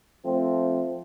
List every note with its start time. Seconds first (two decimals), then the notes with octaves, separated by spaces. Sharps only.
0.24 F3 A3 C4